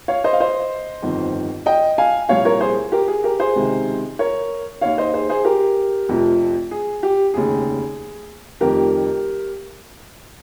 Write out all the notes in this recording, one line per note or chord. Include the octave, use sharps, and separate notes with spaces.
C#5 F5
C5 D#5
F5
C5 D#5
G1 F2 D#3
D#5 G5
F5 G#5
C2 A#2 F3 C#5 F5
A#4 C#5
G#4 C5
G4 A#4
G#4
G4 A#4
G#4 C5
C#2 C3 D#3
A#4 C#5
D#2 D#3 C#5 F5
C5 D#5
G#4 C5
G#4 C5
G4 A#4
F1 F2 C3 F3
G#4
G4
F1 D#2 C#3 G#4
F1 F2 D#3 G4 A#4